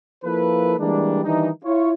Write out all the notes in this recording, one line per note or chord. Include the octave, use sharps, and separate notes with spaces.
F3 A#3 E4 A4 B4
E3 G3 G#3 A#3 D4
D#3 E3 G3 D4 D#4
E4 F4 C#5